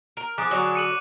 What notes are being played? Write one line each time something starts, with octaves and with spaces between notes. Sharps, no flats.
A#4
F3 G#4 D6 F#6 D7
D3 F#3
C#7 D#7 F#7